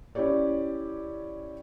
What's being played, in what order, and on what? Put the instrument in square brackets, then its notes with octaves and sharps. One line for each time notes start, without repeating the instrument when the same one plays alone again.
[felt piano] C#4 E4 G4 C#5 D5